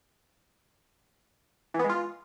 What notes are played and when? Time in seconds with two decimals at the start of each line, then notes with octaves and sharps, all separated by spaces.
1.74 E3
1.79 B3
1.84 G#3
1.89 F4